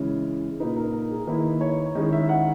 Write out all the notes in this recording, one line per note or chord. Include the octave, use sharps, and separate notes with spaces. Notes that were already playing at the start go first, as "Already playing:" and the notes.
Already playing: C#3 E3 G#3
A#2 A#3 D#4 B4
A#4
A#4
G#4
D#3 A#3 E4 B4
C#5
D#3 G#3 C#4 E4 D#5
E5
F#5